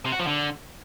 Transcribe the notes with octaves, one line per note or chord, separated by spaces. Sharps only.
C3
F#4
F3
D3